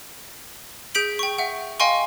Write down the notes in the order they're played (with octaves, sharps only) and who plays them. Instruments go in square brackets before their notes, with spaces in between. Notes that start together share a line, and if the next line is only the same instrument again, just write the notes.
[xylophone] G#4 G6 B6 D7 F#7
G5 C#6
E5 F#5
D#5 F5 G5 G#5 C6 C#6